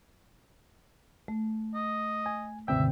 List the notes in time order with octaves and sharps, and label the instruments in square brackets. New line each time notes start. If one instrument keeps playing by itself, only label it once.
[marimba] A3
[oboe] D#5
[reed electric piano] G#5
[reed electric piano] C#2 C4 G5 [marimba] G2 B2 D3 [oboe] E5